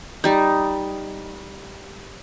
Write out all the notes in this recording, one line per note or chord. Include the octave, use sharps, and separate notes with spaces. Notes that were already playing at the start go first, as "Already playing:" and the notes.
G3 D#4